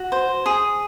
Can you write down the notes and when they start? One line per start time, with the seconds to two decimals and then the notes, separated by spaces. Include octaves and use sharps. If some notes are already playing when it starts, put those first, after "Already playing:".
Already playing: F#4
0.12 C5
0.46 G#4